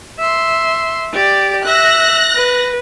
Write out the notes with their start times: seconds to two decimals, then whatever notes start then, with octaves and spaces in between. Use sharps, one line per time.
0.19 E5 C6
1.13 G4 D5
1.65 E5 F#6 A#6
2.34 B4